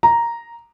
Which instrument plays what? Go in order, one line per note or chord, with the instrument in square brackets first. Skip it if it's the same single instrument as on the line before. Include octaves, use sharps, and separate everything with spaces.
[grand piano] A#5